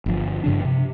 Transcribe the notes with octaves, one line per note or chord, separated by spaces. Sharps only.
G1 F3
G2 C#3 D4
C3